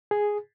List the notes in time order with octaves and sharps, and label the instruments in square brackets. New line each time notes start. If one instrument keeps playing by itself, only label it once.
[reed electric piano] G#4